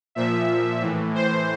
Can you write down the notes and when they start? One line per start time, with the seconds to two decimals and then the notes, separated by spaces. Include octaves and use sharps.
0.15 A#2 F3 E5
0.81 A2 E3
1.15 C5